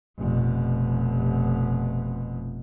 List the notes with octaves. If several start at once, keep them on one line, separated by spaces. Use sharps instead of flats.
F1 B2